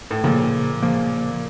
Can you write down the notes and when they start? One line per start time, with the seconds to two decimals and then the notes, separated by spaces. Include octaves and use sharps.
0.11 A2
0.24 A#2 C#3 F3 A#3
0.83 C#3 F3 A#3